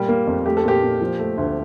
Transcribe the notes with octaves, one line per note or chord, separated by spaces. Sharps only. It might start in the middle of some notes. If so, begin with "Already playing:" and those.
Already playing: A#2 G3
A#3
F2
A3 G4
A4
A#2 G4
A#2
F3
A3
D2